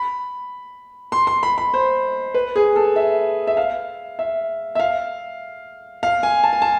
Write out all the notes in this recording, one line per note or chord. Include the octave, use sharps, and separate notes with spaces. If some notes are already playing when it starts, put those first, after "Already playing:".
Already playing: B5
C6
C6
B5
B5
C5
B4
G#4
A4
E5
E5
F5
E5
E5
F5
F5
G#5
A5
G#5
A5